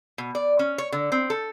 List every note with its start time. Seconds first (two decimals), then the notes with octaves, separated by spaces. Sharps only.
0.18 B2
0.35 D5
0.59 C#4
0.78 C#5
0.92 D3
1.12 C4
1.30 A4